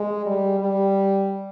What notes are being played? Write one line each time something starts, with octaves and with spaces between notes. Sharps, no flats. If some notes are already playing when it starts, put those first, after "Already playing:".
Already playing: G#3
G3
G3